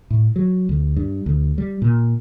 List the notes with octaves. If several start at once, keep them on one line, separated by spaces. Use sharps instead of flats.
A2
F#3
D2
G2
D2
G3
A#2